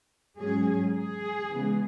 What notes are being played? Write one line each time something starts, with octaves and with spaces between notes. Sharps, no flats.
G#2 F#3 C#4 G#4
G#4
C#3 E3 G#3 B3